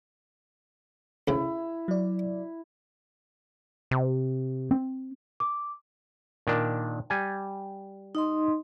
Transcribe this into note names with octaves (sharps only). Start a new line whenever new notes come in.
D2 C#3 E4
F#3 D5
C3
C4
D6
A#2 D#3 D4
G3 G#5
D#4 D#5 C6